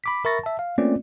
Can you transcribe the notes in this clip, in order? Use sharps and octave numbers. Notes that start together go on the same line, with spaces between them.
B5 D6 B6
A#4 E5 B5 C#6 A6 A#6
E5 A5
F5
A3 A#3 C4 C#4 F4 D5